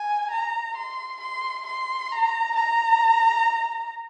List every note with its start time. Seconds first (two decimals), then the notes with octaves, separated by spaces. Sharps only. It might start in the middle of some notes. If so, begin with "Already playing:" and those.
Already playing: G#5
0.31 A#5
0.76 C6
1.21 C6
1.66 C6
2.11 A#5
2.55 A#5